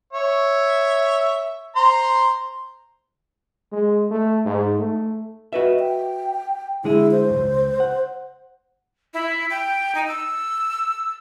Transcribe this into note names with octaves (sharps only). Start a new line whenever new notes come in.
C#5 E5
C5 A#5 C6
G#3
A3
G#2
A3
F#4 B4 D#5 E5
G5
D3 G#3 E4 G#4
C5
C#2 F#2
F#5
E4
G5
D#4
E6